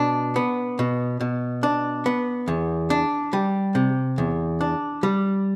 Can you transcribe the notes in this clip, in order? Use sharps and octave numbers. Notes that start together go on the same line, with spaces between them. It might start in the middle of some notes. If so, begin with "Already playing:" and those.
Already playing: B2 D4
B3
B2
B2
D4
B3
E2
D4
G3
C3
E2
D4
G3